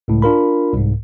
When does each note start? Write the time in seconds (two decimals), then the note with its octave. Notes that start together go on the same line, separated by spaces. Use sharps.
0.08 C#2 A2
0.22 D4 F4 A#4 B5
0.73 C2 G#2